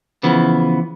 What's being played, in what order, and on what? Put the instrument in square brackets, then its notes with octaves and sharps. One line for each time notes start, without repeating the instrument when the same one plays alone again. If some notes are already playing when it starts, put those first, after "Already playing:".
[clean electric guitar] C#3 E3 F3 B3